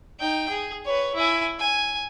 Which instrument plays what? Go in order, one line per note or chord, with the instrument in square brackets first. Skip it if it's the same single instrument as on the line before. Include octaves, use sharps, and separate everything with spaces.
[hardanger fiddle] D#4 G5
G#4
B4 C#5
E4 G#5
G#5